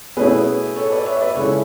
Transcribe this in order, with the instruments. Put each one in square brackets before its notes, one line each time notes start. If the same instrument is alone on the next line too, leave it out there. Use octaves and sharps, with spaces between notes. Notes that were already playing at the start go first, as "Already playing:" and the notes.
[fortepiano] B2 A3 C#4 E4 [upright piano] G#4 B4
[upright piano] A4 C#5
B4 D5
C#5 E5
E5
B4 D5
[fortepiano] C#3 G#3 C#4 E4 [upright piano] A4 C#5